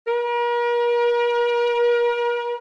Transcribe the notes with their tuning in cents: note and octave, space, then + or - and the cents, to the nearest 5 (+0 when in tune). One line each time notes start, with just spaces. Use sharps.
A#4 +40